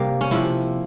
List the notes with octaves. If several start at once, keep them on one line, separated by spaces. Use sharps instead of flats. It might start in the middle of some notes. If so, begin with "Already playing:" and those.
Already playing: G2 C3 G3 A#3
C#4
C3 F3 E4